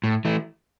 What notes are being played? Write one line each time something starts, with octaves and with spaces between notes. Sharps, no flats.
A2
E3 A3